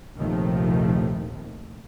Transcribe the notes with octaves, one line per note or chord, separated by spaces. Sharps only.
A#1 D#2 C3 D#3 F3 A3